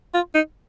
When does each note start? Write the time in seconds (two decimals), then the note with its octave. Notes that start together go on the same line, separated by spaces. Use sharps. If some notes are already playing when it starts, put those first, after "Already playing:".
0.14 F4
0.34 D#4